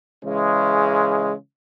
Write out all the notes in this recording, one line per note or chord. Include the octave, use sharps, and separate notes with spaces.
C#3 E3 G#3